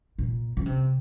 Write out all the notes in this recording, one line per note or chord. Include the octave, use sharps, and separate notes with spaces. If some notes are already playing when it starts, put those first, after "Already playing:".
A#2
C#3
C3